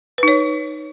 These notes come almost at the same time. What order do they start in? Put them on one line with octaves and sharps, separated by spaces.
B4 D#4 C#5